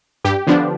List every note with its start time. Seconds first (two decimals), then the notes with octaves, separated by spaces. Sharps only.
0.24 G2 G4
0.47 D3 F3 B3 D4